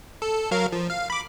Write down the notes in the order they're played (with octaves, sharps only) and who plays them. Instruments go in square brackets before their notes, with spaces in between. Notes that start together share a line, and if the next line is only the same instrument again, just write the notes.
[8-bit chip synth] A4
F#3 A#4 F5
F3
F5
B5 D6